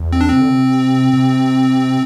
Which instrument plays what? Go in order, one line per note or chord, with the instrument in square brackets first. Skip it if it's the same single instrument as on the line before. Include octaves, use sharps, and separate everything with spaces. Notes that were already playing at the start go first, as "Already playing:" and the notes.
Already playing: [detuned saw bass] E2
[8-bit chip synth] C4
D4
[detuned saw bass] C3 [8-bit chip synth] C4
[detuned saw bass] D3
C3
C3